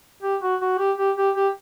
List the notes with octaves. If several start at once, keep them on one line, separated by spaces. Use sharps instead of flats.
G4
F#4
F#4
G4
G4
G4
G4